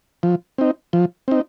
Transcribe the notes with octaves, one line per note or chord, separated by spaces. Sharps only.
F3
C4 D#4
F3
C4 D#4